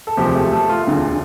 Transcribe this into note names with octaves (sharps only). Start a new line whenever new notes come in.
A4
E1 D2 C3 F3 G4
A3 A4
A3 A4
F4
E1 D2 D3